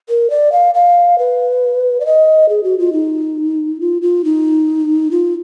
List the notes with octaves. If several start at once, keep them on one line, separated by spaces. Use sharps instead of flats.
A#4
D5
F5
F5
B4
D5
D#5
G#4
F#4
F4
D#4
F4
F4
D#4
F4